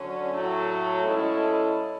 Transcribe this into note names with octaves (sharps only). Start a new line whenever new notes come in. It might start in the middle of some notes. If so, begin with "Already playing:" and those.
Already playing: D3 F#3 C#4
A2 F#3 A3
B2 G#3 C#4 E4 A4